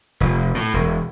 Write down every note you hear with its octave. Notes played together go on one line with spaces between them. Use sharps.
F1
A2
E1